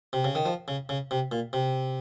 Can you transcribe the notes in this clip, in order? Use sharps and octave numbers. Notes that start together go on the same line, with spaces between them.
C3
C#3
D#3
F3
C#3
C#3
C3
A#2
C3